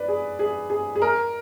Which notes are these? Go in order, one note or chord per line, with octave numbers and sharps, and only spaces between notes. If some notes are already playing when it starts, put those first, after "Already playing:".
Already playing: B4 D5
G#4
G#4
G#4
G#4
A#4